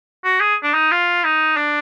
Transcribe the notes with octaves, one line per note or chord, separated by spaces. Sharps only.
F#4
G#4
D4
D#4
F4
D#4
D4